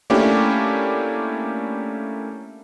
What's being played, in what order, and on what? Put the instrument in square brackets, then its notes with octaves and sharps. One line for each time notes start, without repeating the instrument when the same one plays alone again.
[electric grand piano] A3 A#3 C#4 D4 E4 G4